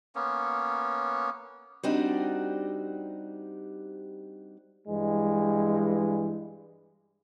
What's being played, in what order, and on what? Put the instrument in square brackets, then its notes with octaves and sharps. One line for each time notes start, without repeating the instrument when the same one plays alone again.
[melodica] A#3 B3 C#4
[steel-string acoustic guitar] G3 C4 D4 D#4 F#4 G4
[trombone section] G2 E3 G#3